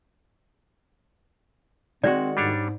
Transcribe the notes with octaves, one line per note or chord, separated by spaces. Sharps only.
D#3 G#3 C4 F#4 D5
G#2 G3 D4 C#5